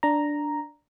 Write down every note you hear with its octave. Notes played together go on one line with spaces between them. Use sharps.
D4 A#5